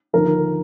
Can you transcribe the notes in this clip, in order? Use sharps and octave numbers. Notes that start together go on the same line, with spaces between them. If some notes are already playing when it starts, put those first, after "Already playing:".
D#2 D3 F3 A#4